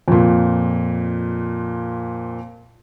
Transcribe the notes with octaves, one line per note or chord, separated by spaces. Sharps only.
F2 A#2